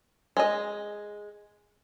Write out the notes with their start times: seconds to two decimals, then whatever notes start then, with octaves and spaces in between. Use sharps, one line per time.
0.37 G#3 D#5